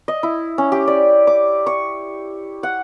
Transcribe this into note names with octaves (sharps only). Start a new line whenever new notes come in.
D#5
E4
C#4
G4
D5
D6
C#6
F#5